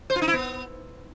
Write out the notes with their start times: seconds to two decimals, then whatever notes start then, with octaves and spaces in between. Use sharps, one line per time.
0.10 C5
0.16 F4
0.22 D#4
0.28 E4
0.33 B3